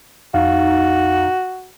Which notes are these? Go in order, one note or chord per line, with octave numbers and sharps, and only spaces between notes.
F2 D#4 F#4 F5